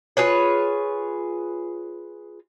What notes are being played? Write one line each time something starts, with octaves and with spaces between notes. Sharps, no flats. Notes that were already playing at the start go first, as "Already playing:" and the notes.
F4 G#4 B4 C#5